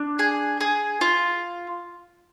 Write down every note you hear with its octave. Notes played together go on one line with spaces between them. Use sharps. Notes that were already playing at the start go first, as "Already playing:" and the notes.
Already playing: D4
G#4
G#4
F4